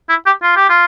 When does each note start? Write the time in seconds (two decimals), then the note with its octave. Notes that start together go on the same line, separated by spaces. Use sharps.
0.09 E4
0.26 G4
0.43 F4
0.56 G4
0.69 F4